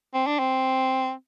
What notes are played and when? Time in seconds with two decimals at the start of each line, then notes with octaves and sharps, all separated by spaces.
0.14 C4
0.27 D4
0.39 C4